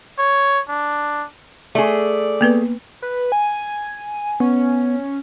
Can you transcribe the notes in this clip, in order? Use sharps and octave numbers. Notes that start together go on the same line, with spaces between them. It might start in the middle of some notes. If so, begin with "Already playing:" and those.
C#5
D4
A3 G#4 D5
A#3 B3 B4
B4
G#5
B3 C#4